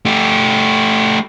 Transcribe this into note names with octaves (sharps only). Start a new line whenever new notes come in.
A3 G4